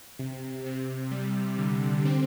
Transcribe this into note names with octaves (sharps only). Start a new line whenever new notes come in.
C3
C3
G3
D3
C4